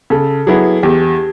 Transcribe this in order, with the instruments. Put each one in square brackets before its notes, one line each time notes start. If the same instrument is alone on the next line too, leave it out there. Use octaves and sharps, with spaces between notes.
[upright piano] C#3 [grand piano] A4
[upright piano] F#3 B3 E4 [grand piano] G#4
[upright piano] E2 [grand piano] G4